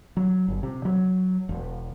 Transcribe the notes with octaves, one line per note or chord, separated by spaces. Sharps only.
F#3
G1
C3
F#3
E1